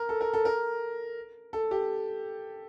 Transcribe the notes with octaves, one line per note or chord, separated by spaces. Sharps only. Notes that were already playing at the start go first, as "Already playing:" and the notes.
Already playing: A#4
A4
A#4
A4
A#4
A4
G4